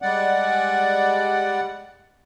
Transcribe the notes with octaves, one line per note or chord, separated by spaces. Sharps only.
G3 G#3 D5 F#5